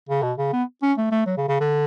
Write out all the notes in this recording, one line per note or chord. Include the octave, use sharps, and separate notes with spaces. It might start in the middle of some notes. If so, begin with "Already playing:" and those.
C#3
B2
C#3
B3
C#4
A3
A3
F#3
C#3
C#3
D3